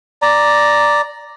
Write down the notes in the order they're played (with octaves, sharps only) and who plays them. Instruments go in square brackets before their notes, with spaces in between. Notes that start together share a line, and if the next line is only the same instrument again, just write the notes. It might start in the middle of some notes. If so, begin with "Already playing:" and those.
[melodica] D5 A#5